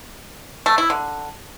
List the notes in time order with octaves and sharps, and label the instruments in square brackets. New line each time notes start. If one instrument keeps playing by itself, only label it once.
[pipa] A3
E4
D3